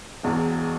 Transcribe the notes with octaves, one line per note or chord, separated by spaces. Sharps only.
E1 E2 B2